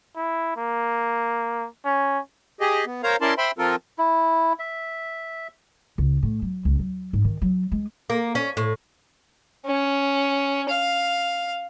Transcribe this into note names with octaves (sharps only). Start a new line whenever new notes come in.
E4
A#3
C#4
G4 G#4 D#5
B3
A#4 C5 C#5 F5 A#5
C#4 E4 A#4 D5 A5 C6
C5 E5 G5 B5 C6
F3 C4 F4 A4 A#4
E4
E5
C#2
A2
F#3
C#2
F#3
G#2
D#3
F#3
G#3
A#3
C#4
A2
C#4
F5